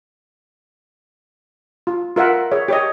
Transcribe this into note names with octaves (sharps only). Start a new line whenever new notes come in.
F4
F4 A#4 E5 F#5
G#4 C#5 E5
G4 C#5 D#5